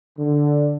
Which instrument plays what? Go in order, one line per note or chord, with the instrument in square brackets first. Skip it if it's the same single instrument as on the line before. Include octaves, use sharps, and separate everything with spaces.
[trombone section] D3